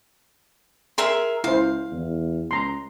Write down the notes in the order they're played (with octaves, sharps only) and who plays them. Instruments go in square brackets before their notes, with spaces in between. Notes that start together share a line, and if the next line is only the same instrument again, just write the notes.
[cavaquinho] G#4 A#4 E5 [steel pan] C6
[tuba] C#2 [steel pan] E4 C5 [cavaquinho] F5
[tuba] E2
[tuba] C#2 [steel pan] A#5 C6